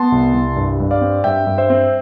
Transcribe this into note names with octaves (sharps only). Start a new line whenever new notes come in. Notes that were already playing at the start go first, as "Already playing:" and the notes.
Already playing: B3 A5 C6
C2
C2
G2
G2
D5 F5
C4
G2 E5 G5
G2
C5 E5
C4